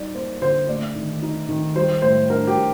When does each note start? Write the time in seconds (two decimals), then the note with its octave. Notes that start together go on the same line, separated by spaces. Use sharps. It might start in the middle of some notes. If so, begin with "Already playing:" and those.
Already playing: G3 D#4 D5
0.15 A#3 C5
0.42 D3 C5
0.69 A3 D5
0.95 D#3
1.22 D#4
1.49 D#3
1.76 G3 C5
2.02 A2 C5
2.30 D4 A#4
2.47 G4
2.56 A2